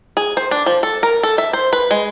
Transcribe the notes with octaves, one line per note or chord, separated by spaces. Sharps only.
G#4
C5
D4
F3
A4
A#4
A4
E5
C5
B4
G#3